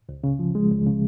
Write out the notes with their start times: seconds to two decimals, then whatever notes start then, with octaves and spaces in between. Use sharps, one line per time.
0.09 C#2
0.24 C#3
0.39 F3
0.55 G#3
0.71 C#2
0.86 C#3